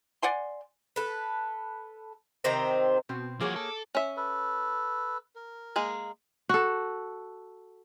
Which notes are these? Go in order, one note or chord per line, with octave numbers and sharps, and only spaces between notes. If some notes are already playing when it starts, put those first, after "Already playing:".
D5 F#5 G#5 C6
A4 B4
C3 D#3 C4 A#5
B2 C4
F3 A#3 F#4 G#4 C#5 D6
A4
C#4 E5
A4 B4
A#4
G#3 A#3 G#4
F#4 A4